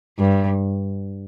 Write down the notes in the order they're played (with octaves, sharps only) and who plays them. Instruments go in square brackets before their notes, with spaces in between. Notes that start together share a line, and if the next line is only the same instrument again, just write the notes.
[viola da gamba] G2